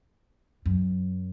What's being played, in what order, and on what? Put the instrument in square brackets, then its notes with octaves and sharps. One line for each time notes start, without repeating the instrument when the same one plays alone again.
[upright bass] F#2